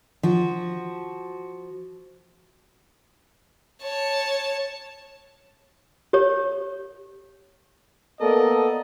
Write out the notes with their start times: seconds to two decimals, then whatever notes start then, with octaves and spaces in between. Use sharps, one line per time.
0.23 F3 F#4
3.82 C#5 A5
6.13 G4 C#5
8.20 A#3 B3 A4 A#4 D5 D#5